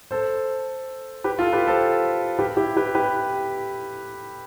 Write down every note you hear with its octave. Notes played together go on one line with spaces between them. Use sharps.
A4 C5
G4 B4
F4 A4
G4 B4
A4 C5
G4 B4
E4 G4
G4 B4
G4 B4